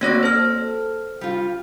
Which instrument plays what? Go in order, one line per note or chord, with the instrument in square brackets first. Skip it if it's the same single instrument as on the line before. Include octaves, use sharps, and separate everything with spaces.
[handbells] A#3 C#5 A#6 [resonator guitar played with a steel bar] C4 F#4 D5
[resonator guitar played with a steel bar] A4 [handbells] C5 F6
[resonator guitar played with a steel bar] G3 F4